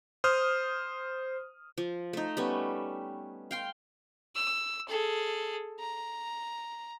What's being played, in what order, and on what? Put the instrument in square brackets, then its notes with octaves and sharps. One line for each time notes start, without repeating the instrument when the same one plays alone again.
[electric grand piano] C5 D#6 F6
[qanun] F3
A3 D#4
G3 A3 B3 C#4
F5 G5 C6
[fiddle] E6
G#4 A4
A#5